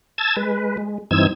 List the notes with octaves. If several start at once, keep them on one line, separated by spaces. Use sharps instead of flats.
A5 E6 G#6 A6
G#3 B4
G#3
G2 E3 C4 D#4 E6 G#6